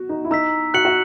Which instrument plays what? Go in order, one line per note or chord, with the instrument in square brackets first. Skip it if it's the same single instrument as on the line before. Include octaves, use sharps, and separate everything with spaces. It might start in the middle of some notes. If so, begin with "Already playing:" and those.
Already playing: [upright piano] F#4
D#4
E4
[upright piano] D#4 [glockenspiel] A#5 E6 B6
[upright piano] F#4 [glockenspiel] F#6 C#7 F#7
[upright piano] F#4